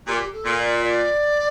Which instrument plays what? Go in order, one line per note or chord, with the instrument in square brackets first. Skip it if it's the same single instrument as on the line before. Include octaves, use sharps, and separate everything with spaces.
[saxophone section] A#2 [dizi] G4
[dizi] A4
[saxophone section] A#2
[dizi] D5
D5